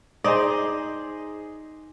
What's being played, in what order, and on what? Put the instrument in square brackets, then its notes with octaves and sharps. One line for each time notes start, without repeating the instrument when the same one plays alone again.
[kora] D#4 D5 [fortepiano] G#4 C5 D#5